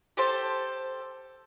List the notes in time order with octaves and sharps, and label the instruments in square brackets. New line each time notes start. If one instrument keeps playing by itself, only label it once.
[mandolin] G4 A4 C5 A5